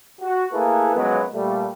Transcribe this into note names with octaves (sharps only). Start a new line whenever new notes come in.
F#4
A3 A#3 E4 G#4 A4 B4
F#2 F3 F#3 G#3 B3
A#2 G3 A3